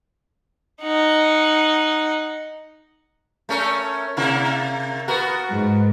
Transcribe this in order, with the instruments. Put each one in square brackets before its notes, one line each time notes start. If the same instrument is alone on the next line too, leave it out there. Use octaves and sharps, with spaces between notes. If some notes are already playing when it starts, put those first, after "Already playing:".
[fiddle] D#4 F#5
[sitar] A3 C#4 A#4
C3 A#3 E4
B3 F#4 A#4
[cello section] G#2